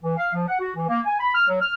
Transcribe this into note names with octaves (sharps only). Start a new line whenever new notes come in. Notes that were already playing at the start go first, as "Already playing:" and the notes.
E3
F5
F3
F#5
F#4
E3
A#3
G#5
B5
F6
F#3
F6